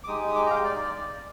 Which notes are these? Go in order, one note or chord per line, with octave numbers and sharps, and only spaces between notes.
D6
G#3 D#4 G4 D#6
D#6
D6
A#5
F5
G5
D5